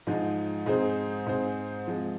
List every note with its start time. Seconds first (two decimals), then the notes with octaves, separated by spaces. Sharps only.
0.07 G#2 F3 G#3 D#4
0.66 G#2 G#3 C4 G#4 C5
1.26 G#2 G#3 C4 G#4 C5
1.86 C3 F3 G#3